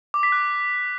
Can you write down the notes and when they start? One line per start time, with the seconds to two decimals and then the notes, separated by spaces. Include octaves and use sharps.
0.14 D6
0.23 B6
0.32 F#6